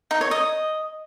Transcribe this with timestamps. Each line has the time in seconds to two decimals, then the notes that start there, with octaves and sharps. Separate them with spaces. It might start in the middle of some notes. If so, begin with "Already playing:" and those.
0.11 D#4
0.21 C#5
0.31 D#5